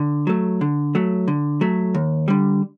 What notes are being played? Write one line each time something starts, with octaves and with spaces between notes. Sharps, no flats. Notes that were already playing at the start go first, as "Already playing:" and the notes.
Already playing: D3
F#3 A3
D3
F#3 A3
D3
F#3 A3
D#2
D3 G3